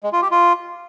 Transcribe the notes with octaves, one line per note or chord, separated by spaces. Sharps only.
G#3
F4
G4
F4